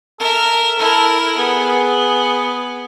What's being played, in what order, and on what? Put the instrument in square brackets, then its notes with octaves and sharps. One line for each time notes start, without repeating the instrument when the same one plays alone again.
[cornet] A4 [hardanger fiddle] A#4 E5
[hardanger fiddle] E4 A#4 [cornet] A4
[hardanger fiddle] B3 [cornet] G#4